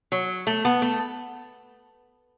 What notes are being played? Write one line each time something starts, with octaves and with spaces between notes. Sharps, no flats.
F#3
A3
B3
A3